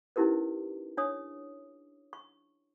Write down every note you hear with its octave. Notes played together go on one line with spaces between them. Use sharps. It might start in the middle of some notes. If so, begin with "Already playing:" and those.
C#4 D#4 E4 G4 A#4 B4
D4 C#5 D#6
C#6